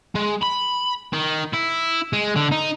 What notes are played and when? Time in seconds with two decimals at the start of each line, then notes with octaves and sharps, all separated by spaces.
0.15 G#3
0.42 B5
1.13 D#3
1.54 E4
2.13 G#3
2.36 D3
2.52 D#4